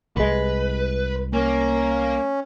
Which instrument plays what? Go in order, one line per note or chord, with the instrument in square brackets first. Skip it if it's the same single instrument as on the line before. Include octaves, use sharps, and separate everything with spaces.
[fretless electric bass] C2 G#3 [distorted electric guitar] B4
[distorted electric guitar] A#3 [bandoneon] C#4